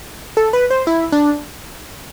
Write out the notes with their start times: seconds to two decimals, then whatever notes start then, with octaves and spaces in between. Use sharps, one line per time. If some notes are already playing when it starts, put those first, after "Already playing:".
0.37 A4
0.53 B4
0.70 C5
0.87 E4
1.12 D4